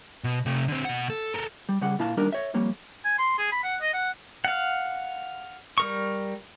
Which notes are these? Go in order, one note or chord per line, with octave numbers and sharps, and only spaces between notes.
B2
C3 A3
D3 C4
B2 F#5
A4
A4 A#4
G3
C#3 G3 F#5
A#2 E4 F5 A5
D#2 G3 D4 D#4 A#4
C#5 E5
F2 G3 A#3 C#5
G#5
C6
G#4
B5
F#5
D#5
F#5
F5 F#5
G3 A#4 C#6